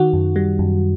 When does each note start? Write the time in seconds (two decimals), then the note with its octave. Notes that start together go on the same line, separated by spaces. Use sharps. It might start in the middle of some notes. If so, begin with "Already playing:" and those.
Already playing: D#3 F#4
0.13 F#2
0.36 G3
0.59 F#2